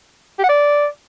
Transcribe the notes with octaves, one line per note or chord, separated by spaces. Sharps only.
G4
F#5
D5